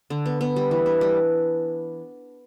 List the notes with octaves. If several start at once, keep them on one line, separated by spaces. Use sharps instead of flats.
D3
B3
B3
G3
E3
D4
G3